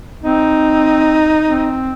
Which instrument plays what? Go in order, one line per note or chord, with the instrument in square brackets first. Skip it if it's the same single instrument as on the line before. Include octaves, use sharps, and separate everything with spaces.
[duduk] C4 [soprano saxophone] D#4
[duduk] C4